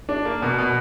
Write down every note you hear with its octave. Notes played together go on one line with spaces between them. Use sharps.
D4
A#3
B2
B2